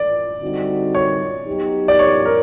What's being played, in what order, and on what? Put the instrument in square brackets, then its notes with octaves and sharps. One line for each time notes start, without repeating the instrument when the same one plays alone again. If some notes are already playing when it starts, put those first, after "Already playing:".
Already playing: [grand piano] D5
[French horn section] D3 G3 C4 D#4 F#4
[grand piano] C#5
[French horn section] F#3 B3 D#4 G4
[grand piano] D5
C#5
A#4